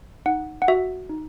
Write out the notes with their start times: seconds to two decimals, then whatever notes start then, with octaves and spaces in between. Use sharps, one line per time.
0.26 D#4 F#5
0.62 F#5
0.68 F#4 E5
1.09 D#4